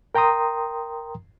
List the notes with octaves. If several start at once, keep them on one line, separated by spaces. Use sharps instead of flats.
A#4 G5 A#5 C6 D#6